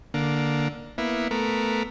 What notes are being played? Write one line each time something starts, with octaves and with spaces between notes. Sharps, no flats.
D3 A#3
A#3 B3 E4
A3 B3 A#4